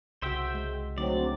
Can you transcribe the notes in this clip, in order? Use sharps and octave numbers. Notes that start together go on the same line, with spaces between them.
C2 C#3 F#4 C5 E5 G5
G#3
D3 F#3 A3 C4 D#4 D5